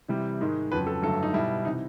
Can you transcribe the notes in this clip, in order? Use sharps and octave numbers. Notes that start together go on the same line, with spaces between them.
C3 E3 G3
G#2 D#3 G#3
F2 C#3 F#3 B4
A4
G2 D3 F#3 A3 A4
D#4
B2 G3 E4
C3 E3 D#4